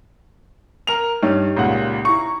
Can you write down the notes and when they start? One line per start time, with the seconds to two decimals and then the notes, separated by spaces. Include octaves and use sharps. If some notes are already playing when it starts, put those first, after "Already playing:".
0.87 A#4 F7
1.23 G2 D#4 G4 C#5
1.56 C#2 A#2 F#5
2.05 E4 A#5 C#6